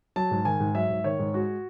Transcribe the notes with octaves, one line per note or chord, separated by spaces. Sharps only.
F#3 A5
G#2
D#3 G#5
G#2
F#3 E5
G#2
D#3 C#5
G#2
G#3 F#4